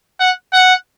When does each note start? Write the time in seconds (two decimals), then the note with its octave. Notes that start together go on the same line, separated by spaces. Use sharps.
0.20 F#5
0.53 F#5